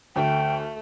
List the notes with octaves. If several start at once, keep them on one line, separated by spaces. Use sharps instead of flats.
D2 A3 G5